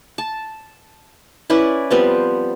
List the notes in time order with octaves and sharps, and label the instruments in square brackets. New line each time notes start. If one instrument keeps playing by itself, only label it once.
[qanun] A5
C#4 E4 B4 D5
F3 G3 B3 C4